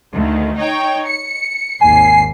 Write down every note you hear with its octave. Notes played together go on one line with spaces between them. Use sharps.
D2 D#3
D#4 C#5 G5
C#7
G#1 D#2 G#5 C7